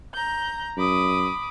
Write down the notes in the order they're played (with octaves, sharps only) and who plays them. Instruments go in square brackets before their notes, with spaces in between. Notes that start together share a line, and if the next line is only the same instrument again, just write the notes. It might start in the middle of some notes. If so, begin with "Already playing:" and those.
[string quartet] A#5 G6
[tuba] F#2 [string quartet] B5 D6 D#6